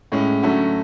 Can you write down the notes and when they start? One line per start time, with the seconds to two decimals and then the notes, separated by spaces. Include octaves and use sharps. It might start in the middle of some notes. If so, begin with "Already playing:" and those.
0.12 A2 G#3 C#4
0.42 D3 F#3 A3 C#4 F#4